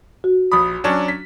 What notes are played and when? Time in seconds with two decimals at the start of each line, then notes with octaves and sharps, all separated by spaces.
0.24 F#4
0.52 A#1 B5 D#6
0.84 F#3 C#4 D4
1.08 B6